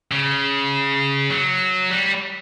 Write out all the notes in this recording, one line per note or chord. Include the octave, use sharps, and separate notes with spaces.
C#3
F#3
G3